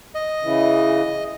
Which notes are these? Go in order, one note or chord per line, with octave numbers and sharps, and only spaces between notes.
D#5
C#3 E3